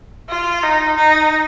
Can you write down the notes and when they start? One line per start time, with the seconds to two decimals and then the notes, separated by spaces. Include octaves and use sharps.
0.29 F4
0.63 D#4
0.97 D#4